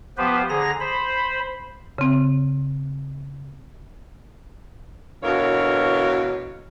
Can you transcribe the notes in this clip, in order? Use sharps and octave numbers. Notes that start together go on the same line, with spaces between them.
F3 B3 G4 B4 C5
D3 G#4 A#5 A#6
C5 B5
C#3 C4
D2 B2 E3 A#4 C#5 F5